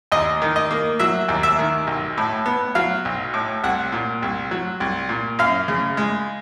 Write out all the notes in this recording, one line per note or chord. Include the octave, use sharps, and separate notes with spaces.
D#2 D#5
D#3
D#5
A#3
F#3 E5
D#2
E5
D#3
B1
A2
B3
F#3 F5
B1
A2
C2 F#5
A#2
C2
F#3
C2
A#2
F#2 F5
C#3
G#3